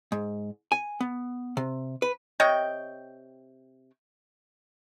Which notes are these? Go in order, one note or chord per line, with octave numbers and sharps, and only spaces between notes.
G#2
G#5
B3
C3
B4
C3 C#5 D#5 G5